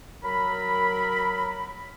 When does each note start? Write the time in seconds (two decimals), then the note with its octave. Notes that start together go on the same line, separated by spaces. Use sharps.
0.24 F#3 A#4 B5